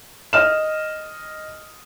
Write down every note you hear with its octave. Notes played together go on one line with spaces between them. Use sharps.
D#5 F6 E7